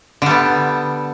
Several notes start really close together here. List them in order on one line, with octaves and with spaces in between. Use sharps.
D3 G3 B3